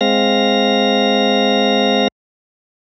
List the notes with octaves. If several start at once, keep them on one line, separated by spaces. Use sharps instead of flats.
G#3 C4 F5 A#6